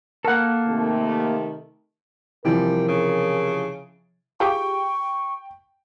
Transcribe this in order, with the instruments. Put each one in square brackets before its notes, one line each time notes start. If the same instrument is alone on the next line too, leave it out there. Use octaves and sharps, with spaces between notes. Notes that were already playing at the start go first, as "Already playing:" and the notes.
[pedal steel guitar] A#3 A4 [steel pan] A#4 F#5
[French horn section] C3 D#3 A3
[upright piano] C3 E3 F3 [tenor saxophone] G3 [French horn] A#4
[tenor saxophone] C#3
[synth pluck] F4 G4 G#4 [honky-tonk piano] G5 [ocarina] C#6